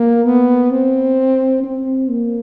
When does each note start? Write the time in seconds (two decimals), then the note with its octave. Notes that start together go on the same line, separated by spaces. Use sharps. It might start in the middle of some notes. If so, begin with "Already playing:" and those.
Already playing: A#3
0.25 B3
0.71 C4
1.64 C4
2.10 A#3